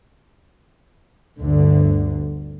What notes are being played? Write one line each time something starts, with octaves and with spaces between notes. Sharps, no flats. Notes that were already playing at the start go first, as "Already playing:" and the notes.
G1 D2 D3